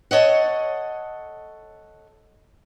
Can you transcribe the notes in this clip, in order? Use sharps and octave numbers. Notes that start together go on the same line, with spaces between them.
A4 C#5 D#5 F#5